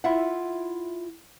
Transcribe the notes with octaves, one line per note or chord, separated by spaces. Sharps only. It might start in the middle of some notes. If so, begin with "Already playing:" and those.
E4 F4 E5 F#5